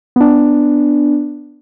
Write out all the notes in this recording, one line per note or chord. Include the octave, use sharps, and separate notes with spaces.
B3 D4